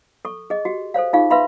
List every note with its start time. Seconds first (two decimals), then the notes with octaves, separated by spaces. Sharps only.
0.25 A4 C#6
0.50 G#4 D#5
0.65 F#4 G4
0.94 A4 C5 C#5 F5
1.13 D#4 F4 G#4 F5 C#6
1.30 B4 E5 F5 B5 C6